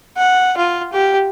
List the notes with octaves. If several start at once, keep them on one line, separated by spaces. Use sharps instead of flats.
F#5
F4
G4